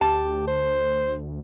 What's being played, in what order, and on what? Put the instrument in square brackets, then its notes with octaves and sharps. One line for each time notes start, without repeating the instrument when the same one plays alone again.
[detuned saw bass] D2 [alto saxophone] G4 [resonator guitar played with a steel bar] A5
[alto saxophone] C5